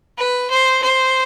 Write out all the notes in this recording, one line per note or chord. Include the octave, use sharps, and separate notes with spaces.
B4
C5
C5